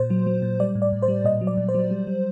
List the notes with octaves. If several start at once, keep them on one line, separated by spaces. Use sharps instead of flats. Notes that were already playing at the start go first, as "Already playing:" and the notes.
Already playing: A#2 C5
F#3
F#3
A#2
G3 D5
A2
D5
A2
C5
G3
A#2 D#5
F#3
D5
A#2
C5
F#3
G3
G3